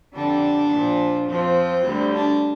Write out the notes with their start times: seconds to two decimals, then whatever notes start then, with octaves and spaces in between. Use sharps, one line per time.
0.14 F2 D3 G3 D4
0.70 A#2 F3
1.27 F2 F3 C4
1.84 D2 D3 G3
2.14 D4